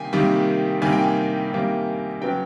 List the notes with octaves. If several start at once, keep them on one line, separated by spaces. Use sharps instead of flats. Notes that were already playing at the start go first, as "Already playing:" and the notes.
Already playing: C3 D#3 G3 A#3 F5 G5 G#5
C3 D#3 G3 A#3
C3 D#3 G3 A#3 G#5
G5
G#5
C3 D#3 G3 A#3
C#3 F#3 B3 G5